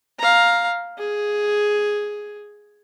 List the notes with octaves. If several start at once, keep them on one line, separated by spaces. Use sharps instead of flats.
F5 A#5
G#4